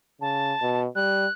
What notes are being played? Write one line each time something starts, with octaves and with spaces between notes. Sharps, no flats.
C#3 A5
B2
G3 F#6